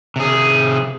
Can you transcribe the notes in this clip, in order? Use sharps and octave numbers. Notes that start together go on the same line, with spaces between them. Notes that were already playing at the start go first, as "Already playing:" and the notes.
C3 G#4